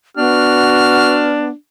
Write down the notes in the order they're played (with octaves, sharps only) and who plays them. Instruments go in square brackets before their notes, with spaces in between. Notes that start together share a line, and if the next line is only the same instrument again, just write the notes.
[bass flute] B3 [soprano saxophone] D4 [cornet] F#4 [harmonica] F6